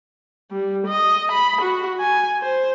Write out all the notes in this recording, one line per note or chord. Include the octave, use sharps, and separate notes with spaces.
G3
D#5
B5
F#4
G#5
C5